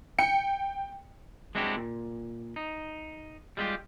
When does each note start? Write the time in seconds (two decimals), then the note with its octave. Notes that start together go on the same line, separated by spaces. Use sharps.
0.19 G5 C#7
1.55 G#3 C4 D4 E4 F#4 G4
1.76 A#2
2.56 D#4
3.57 G3 G#3 E4 F4 G4